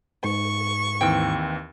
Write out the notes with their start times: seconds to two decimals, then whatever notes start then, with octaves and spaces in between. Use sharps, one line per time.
0.24 G#2 C#6
1.01 D#2 E3 C4 G5